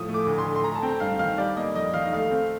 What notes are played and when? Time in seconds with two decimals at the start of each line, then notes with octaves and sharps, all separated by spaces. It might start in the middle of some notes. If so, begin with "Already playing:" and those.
Already playing: A2 F3 D#6
0.08 A3
0.14 D6
0.26 D2
0.38 C6
0.45 D3
0.55 C6
0.64 A3 A#5
0.75 A5
0.82 C4 G5
1.00 G2 F5
1.19 D#3 F5
1.38 G3 D5
1.57 A#3 D#5
1.74 F2 D#5
1.94 D#3 F5
2.04 D#5
2.12 A3 F5
2.31 C4